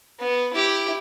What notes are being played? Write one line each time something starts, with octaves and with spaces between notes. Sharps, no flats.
B3
E4 G4